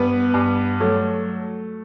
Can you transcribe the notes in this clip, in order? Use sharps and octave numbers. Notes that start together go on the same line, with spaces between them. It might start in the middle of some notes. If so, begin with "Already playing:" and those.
Already playing: G2 B3 B4
G2
F#3 A3 A4